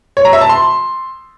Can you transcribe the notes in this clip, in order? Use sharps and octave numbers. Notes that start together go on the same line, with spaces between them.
C#5
A#5
E5
A5
C6